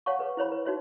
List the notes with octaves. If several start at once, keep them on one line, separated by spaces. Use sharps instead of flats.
C#5 F5 F#5 A5 C#6
G#4 B4
E4 C5 C#5 B5
B4
D#4 F#4 C#5 E5